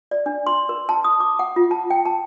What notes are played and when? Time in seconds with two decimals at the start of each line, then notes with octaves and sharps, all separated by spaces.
0.11 D5
0.26 D4
0.47 C6
0.69 A#4
0.89 A5
1.04 D#6
1.20 D6
1.39 F#5
1.56 F4
1.71 A5
1.90 G5
2.05 A5